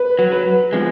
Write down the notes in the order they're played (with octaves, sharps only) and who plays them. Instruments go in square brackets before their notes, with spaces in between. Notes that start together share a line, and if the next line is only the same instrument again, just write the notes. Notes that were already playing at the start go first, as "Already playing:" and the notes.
Already playing: [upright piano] B4
[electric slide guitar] F#3
[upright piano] B4
[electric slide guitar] F3 G#3 [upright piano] B3